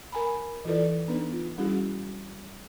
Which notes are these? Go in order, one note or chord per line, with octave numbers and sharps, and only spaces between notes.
A#4 G#5 A#5 B5
E3 E4 F4 A4 B4 D5
B3 D4 D#4 B4
F4
G3 C#4 E4 F#4 G#4